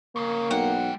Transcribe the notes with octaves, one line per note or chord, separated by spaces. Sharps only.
F2 C#3 A#3
B1 G#3 F#5 G5